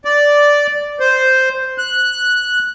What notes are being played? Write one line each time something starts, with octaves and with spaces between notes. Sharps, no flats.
D5
C5
F#6